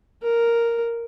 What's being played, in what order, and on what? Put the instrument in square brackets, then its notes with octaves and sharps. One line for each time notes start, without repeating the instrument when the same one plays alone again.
[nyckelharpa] A#4